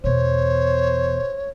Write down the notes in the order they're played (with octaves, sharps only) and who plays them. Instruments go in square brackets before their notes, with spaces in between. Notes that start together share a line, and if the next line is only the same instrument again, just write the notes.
[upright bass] E2 B2 [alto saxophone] C5 [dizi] C#5